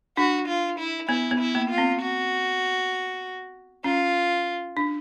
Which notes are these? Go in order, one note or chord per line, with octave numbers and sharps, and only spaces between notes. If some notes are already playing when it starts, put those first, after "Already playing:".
D4 F#4
F4
E4
B3 E4
B3
E4
A#3
F4
C4
F#4
C#4 F4
D4